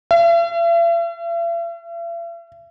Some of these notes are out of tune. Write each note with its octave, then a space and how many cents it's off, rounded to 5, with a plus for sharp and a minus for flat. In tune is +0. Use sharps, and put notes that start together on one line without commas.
E5 +45